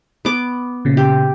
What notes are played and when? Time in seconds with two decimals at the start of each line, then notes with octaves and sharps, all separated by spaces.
0.25 B3 D6
0.85 A#2 C#3
0.97 G4